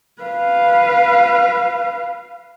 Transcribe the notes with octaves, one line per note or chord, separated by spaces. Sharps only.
B4 F5